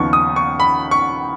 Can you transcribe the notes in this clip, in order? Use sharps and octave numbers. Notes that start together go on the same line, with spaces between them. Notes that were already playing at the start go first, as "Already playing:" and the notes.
Already playing: D#2 C#3 F3 B3 D#4 C#6
D#6
C#6
B5
C#6